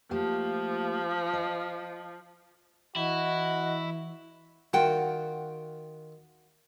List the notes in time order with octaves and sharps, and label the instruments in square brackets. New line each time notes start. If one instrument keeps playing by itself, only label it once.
[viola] F3 [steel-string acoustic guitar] A3 A#3 G4
[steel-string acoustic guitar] D#5
[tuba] E3 [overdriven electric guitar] E4 [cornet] F#4 [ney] D#5
[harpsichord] D#3 F4 [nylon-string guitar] F#4 G5